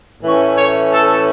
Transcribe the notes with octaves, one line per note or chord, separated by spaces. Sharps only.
A2 E3 A3 C#4
C#5
A4